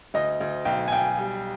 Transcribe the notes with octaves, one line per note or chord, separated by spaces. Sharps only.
D2 D#5
D2
B1 G5
G#5
B1 G5
G3